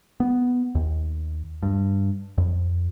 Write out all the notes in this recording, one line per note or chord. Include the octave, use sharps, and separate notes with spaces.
B3
D#2
G2
F2